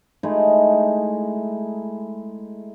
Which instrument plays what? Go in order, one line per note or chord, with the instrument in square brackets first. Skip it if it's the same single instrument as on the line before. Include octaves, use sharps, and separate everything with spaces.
[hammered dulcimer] G#3 A3 D#4 E4